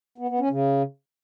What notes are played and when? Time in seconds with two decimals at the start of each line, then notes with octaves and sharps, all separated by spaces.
0.18 B3
0.29 B3
0.39 C#4
0.50 C#3